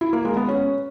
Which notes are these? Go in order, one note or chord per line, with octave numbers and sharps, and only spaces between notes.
E4
A#3
G#3
B3
C#4